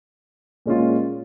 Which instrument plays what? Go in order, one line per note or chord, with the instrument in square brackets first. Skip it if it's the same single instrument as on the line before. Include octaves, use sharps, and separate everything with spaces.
[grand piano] A#2 G#3 C#4 F4